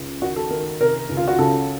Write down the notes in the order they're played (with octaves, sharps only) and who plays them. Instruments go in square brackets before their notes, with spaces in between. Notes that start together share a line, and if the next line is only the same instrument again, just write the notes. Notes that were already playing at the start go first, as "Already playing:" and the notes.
Already playing: [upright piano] C#2 C#3
D#3 F#4
A4
D#3 A#4
C3 A#4
C#2
F4
F#4
C#3 A4